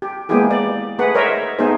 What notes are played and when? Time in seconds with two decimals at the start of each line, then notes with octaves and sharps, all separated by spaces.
0.02 G4
0.29 G#3 A#3 B3 E4 G4 G#4
0.51 D5
0.99 A3 G#4 B4 F#5
1.15 A#4 C5 C#5 D#5 E5
1.59 A3 B3 D#4 G#4 C5